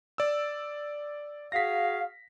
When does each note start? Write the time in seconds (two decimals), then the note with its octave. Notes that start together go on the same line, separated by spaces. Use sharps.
0.18 D5 E6
1.52 F#4 G#4 F5 A#6 B6